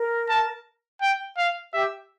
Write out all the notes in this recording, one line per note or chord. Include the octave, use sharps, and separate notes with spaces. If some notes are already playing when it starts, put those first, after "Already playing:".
Already playing: A#4
A5
G5
F5
G4 E5